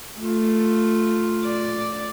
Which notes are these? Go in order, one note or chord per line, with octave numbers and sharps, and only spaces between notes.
A3 F4
D5